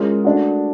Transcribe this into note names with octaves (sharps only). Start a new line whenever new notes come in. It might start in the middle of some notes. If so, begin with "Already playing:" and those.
Already playing: G#3 C#4 F4 A#4
A3 D4 F#4